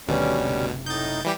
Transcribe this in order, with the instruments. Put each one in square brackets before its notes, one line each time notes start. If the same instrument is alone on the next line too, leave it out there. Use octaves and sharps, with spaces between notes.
[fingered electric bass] D1 D#3 B3 [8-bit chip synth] D2 B2 [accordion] G3 C#4
[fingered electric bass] F#1 C3
[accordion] A2 D#4 [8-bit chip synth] G6 A6
[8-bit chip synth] E3 G3 G4